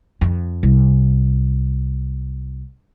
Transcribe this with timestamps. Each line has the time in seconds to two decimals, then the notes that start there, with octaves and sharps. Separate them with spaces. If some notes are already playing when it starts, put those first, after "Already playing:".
0.21 F2
0.63 C2